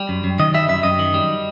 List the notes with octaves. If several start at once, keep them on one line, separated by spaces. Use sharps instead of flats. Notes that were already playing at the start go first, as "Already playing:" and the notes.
Already playing: G3
F#2
F#2
D#3 D#5
G3 E5
F#2 E5
F#2 D#5
D#3
G3